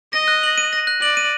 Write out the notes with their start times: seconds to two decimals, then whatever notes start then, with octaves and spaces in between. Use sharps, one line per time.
0.13 D#5 A#6
0.28 F#6
0.43 F#7
0.58 D#7
0.73 A#6
0.87 F#6
1.02 D5 F#7
1.17 D#7